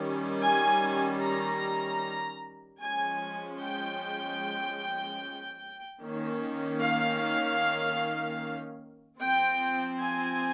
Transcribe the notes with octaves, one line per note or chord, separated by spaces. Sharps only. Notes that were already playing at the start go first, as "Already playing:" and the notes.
Already playing: D#3 G3 C#4
G#5
A#5
F3 G#3 C#4 G#5
G5
D#3 A#3 C#4
F5
F3 C4 G5
G#5